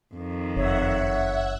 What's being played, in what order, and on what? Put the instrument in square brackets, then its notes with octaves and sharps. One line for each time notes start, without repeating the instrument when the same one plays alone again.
[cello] F2 D#3
[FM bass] F#1 [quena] C#5 [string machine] E5 F#5